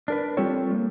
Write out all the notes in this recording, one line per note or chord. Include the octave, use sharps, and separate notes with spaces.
D4 A#4 B4
G3 C4 F4 G4 A4 C#5
A#3